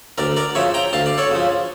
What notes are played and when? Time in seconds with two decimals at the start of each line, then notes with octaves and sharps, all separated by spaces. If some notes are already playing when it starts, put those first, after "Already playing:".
0.18 D2 A#4 D5
0.37 A#4 D5
0.55 C#3 F3 C#5 E5
0.74 G5 A#5
0.93 D2 F5 A5
1.06 D5
1.18 A4 C#5
1.31 C#3 F3